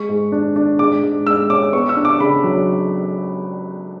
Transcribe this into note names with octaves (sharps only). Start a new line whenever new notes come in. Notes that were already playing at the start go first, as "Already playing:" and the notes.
Already playing: G#3 C#6
G#2
D4
D4
G#2 D6
G#2
G#2 E6
C#4 D6
B3 C#6
E6
D4
D6
C#3 B5
F#3